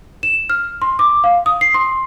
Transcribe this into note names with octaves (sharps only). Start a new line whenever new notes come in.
E7
F6
C6
D6
F5
D#6
C7
C6